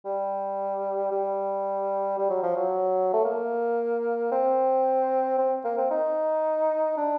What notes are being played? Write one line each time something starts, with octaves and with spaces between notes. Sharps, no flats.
G3
G3
G3
F#3
F3
F#3
A3
A#3
C4
C4
A#3
C4
D#4
D4